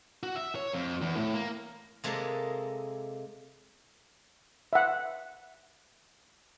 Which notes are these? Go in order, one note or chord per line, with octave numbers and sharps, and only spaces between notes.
F#4
E5
C#5
F2
E2
A2
A#3
C3 G#3 A#3 A4 D#5
E5 F#5